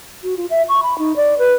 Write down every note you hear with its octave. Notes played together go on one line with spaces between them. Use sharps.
F#4
F4
E5
C#6
B5
D#4
D5
B4